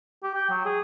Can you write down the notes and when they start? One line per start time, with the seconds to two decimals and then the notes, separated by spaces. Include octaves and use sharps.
0.23 G4
0.35 G5
0.50 F#3
0.65 G#4